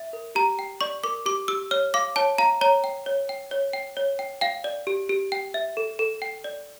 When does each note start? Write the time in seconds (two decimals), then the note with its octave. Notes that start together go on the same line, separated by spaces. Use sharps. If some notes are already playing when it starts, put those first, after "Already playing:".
Already playing: E5
0.13 A#4
0.35 G4 A#5
0.59 G5
0.81 D5 C#6
1.04 A#4 D6
1.26 G4 D6
1.48 G4 E6
1.71 C#5 F6
1.94 F5 D6
2.16 C#5 A5
2.38 F5 A#5
2.61 C#5 A#5
2.84 G5
3.06 C#5
3.29 G5
3.51 C#5
3.73 G5
3.97 C#5
4.19 G5
4.41 F5 G5
4.64 D5
4.87 G4
5.09 G4
5.32 G5
5.54 E5
5.77 A4
5.99 A4
6.22 G5
6.44 D5